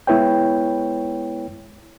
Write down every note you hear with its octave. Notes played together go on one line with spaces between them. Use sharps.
G#3 B3 E4 B4 C#5 G5